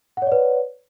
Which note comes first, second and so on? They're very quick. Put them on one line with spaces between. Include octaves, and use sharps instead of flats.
F#5 C#5 D5 B4